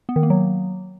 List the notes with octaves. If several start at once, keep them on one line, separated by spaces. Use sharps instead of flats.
B3
D#3
A#3
F#3